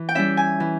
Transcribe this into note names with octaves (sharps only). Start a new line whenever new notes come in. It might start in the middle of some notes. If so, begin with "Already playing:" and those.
Already playing: E3
G5
G3 C#4 E4 E5
G#5
E3